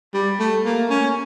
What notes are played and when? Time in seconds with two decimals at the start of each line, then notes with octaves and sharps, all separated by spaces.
0.14 G3
0.39 A3
0.65 A#3
0.90 C#4